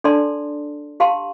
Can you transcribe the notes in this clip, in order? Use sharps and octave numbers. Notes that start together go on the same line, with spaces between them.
D4 A4 D5 A5 C6
G4 F5 A5 C6